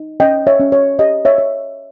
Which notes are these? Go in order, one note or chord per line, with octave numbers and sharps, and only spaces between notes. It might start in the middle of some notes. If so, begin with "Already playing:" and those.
Already playing: D#4
C#4 D#5 G5
C#5 E5
C#4
C#5
G4 D#5
C#5 E5
C#5